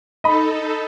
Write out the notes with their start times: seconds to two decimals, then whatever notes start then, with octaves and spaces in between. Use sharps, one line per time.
0.24 D#4 A4 D#5 B5